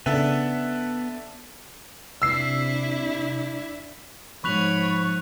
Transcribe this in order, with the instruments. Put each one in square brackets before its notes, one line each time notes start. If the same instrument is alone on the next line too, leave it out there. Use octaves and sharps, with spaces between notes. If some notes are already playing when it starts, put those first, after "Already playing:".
[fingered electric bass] C#3 [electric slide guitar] B3 [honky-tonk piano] D4 A4 E5
[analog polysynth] C3 [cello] D4 E4 [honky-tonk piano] E6 C7
[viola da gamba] G#2 C#5 [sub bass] F3 [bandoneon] B5 [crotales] C#6 F#6 F7